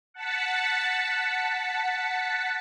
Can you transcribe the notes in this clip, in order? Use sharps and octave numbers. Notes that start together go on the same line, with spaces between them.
F#5 A5 A6 B6 C#7